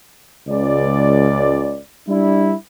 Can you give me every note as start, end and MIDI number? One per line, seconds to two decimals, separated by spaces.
0.47 1.80 37
0.47 1.80 74
2.08 2.55 55
2.08 2.55 62
2.08 2.55 64